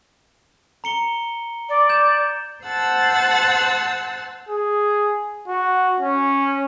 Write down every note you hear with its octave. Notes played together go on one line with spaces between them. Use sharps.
A#5 C#7 G7
D5
G6 E7
C5 F#5 A5 E6
G#4
F#4
C#4